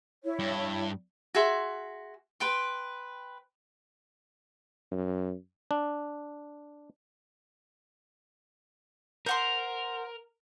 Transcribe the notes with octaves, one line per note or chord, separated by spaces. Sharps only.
E4 C#5
G2
F#4 G#4 E5 C6
B4 G5 C6
F#2
D4
A#4 C5 F#5 C6